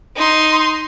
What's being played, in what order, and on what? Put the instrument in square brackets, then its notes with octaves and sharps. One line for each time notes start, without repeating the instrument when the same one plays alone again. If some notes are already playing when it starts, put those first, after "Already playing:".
[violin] D#4 C6